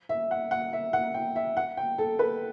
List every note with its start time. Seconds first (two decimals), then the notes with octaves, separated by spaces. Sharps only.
0.09 E5
0.31 F#5
0.51 F#5
0.73 E5
0.93 F#5
1.14 G5
1.36 E5
1.57 F#5
1.77 G5
1.98 A4
2.19 B4